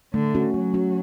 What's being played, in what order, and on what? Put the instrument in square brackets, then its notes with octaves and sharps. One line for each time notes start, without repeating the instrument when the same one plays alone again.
[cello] D3 [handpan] A3
[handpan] C#4 F#4
[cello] F#3 [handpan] A3
[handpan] C#4 F#4